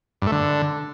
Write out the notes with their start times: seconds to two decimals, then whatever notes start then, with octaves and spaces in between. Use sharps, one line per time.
0.22 G2
0.27 A3
0.32 D3